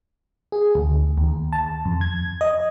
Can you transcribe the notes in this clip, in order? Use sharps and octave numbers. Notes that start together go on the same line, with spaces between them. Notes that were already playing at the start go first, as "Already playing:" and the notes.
G#4
D2
D#2
A5
F2
G#6
D#5